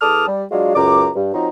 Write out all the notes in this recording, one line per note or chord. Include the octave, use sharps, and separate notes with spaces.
E2 A4 A5 D6 D#6 F6
G3
F#3 G#3 D4 F4 F#4 F5
C#2 F#2 A#5 D6
G2
F3 C4 D#4 F#4 C#5 A#5